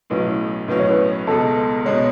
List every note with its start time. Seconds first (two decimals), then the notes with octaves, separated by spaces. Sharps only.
0.10 B1 A2 F#3 C#4 B4
0.68 B1 A2 F#3 C#4 B4
0.79 C#5
0.90 B4
1.27 C#2 B2 G#3 A4
1.85 B2 G#3 C#5